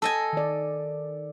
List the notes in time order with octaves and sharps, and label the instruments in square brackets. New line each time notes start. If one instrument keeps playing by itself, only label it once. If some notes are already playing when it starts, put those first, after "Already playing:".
[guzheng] A4 D#5 G#5
[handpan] D#3 D5